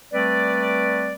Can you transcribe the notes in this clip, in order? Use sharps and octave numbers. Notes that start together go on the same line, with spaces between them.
G3 A3 C4 B4 D5